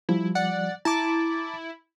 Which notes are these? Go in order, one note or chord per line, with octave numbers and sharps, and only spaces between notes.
F3 G3 E4
D5 F#5
E4 A5 A#5 D6